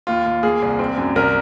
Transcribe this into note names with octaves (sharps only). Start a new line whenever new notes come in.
D#2 F4
D#2
A#3 G#4
C2
C4
F#2
C2 A#4